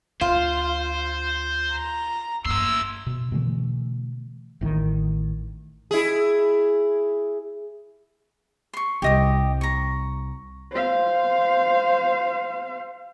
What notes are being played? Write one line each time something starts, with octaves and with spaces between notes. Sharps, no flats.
D2 F4 C5
A#5
G2 A3 A#3 C6 E6
B2
B2 D3 E3 A3
A1 A2 C3 D#3
E4 G#4
C6 C#6
C2 G4 D#5 D#6
A#5 C#6
C5 F5